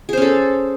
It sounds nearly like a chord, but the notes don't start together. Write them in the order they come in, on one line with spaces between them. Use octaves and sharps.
G#4 C5 C#4 A4